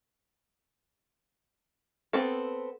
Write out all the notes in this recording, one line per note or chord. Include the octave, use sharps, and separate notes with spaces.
B3 C4 A4